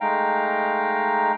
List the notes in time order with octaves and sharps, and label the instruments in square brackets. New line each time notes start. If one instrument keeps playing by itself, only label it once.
[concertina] G#3 A3 D#4 F5 G5 A#5